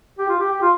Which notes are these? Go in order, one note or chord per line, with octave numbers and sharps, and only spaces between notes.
G4
F4
G4
G4
F4